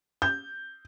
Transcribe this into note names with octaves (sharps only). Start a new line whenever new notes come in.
G6